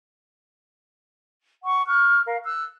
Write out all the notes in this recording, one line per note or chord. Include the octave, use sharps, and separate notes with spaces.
F#5 C#6
C#6 F6 F#6
A#4 F5
E6 F#6